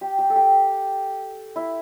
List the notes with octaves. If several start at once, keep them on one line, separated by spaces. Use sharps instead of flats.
G4
G4
A4
G4
E4